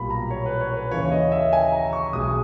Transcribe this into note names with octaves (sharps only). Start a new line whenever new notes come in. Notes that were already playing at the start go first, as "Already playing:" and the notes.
Already playing: B1 A#2 G3 B5
A#5
C#5
B4
C#5
B4
D#2 C#3 E3 C#5
D#5
E5
G#5
A#5
C#6
B1 B2 G#3 D#6